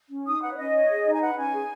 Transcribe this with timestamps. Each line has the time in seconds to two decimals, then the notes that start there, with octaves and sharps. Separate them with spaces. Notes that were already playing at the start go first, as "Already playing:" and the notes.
0.10 C#4
0.26 D#4 D#6
0.41 B4 F#5
0.52 C#5
0.57 C#4 D#5
0.73 C#5
0.89 G#4
1.05 D#4
1.13 G#5
1.20 B4 F#5
1.36 C#4 G#5
1.52 G#4